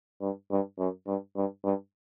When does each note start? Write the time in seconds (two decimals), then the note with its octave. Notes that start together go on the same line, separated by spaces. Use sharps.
0.21 G2
0.51 G2
0.78 F#2
1.07 G2
1.36 G2
1.64 G2